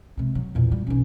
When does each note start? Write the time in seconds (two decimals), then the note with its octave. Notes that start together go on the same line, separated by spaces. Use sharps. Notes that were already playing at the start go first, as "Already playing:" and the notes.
0.17 C3 G#3
0.35 F#3
0.55 E2 A#2
0.72 G3
0.87 B1 C#4